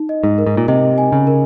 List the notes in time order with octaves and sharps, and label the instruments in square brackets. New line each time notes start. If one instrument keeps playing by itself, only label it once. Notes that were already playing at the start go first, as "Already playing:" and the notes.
Already playing: [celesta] D#4
D#5
[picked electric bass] G#2
[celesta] A#4
[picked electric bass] G#2
A#2
[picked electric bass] C3 [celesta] D#5
[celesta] G#5
[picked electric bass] C#3
[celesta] A#4